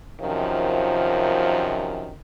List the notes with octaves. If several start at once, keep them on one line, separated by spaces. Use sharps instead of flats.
F#2 C3 D#3 F3